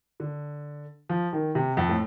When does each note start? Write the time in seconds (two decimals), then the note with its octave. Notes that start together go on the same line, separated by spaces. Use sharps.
0.20 D3
1.09 F3
1.33 D#3
1.55 C3
1.77 F2
1.89 A2